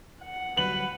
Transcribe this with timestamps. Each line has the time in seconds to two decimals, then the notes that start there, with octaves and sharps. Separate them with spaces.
0.23 F#5
0.57 D2 F#3 G3 B4 F#7